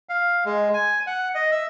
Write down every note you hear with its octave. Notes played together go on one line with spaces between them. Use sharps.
F5
G#3
G#5
F#5
D#5
E5